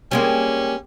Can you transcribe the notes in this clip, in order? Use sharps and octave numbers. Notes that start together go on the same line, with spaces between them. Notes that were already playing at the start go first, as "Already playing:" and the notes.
G3 G#3 A#3 C#4